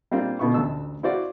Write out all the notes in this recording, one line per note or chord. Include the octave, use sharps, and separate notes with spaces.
G3 A#3 C4 D4 F4
B2 D3 B3 F4 C#6
A1 D2 A5 E6
E4 F#4 C5 D5 F5 F#5